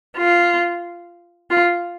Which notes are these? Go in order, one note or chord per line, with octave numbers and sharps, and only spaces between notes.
F4
F4